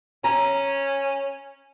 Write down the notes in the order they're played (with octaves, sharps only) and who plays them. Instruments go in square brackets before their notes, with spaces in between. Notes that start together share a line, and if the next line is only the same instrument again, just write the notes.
[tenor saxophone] C#4 [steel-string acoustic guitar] A#5